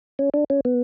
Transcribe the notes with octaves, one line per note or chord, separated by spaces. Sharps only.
C#4
D4
C#4
B3